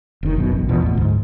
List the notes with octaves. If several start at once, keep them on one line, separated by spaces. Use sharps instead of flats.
F1 D#3
B1 F#2 B2
A1
E2 B2 F3
E2 A2
D2 G#2